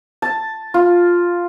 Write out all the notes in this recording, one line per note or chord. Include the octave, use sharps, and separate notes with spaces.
A5
F4